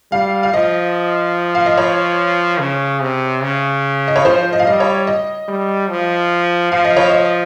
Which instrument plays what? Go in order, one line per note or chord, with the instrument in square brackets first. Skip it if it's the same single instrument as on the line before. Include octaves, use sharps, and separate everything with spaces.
[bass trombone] G3 [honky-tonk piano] F5
[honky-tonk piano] F5
[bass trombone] F3 [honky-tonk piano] D#5
[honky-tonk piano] F5
D#5
C#5
[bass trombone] C#3
C3
C#3
[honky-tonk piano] D#5
C#5
[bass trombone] F3 [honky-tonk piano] C5
[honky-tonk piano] D#5
F5
[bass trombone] G3 [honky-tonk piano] D#5
[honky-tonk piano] C#5
D#5
[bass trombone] G3
F3
[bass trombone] F3 [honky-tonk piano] F5
[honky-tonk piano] D#5
C#5
D#5